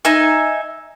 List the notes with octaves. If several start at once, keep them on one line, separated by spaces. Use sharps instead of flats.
D#4 E5 G#5